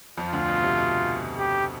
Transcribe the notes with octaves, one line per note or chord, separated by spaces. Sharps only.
F2 F3 F4
D2 D3
B2
C3
B2
G4